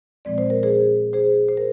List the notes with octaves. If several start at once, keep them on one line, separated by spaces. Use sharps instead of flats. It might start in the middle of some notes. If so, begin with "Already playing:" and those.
A#2 F3 G#3 C4 D5
C5
A#4
G#4 C5
G#4 C5
C5
A#4